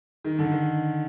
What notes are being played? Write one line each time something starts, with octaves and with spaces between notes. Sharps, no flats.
D#3
D3
D#3